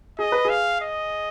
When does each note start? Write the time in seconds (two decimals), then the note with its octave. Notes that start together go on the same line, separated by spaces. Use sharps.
0.19 G#4 D#5
0.32 B4
0.45 G#4 F5
0.81 D#5